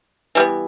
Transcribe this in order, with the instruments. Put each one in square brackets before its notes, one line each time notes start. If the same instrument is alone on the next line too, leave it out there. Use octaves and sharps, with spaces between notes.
[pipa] E3 G3 B3